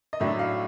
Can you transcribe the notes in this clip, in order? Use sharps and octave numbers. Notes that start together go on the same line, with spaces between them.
D#5
A2 F#3 A3 D4 E5
F5